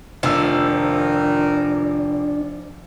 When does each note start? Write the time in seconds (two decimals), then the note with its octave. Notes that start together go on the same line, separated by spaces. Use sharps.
0.23 F1 D#3 F3 D4 E6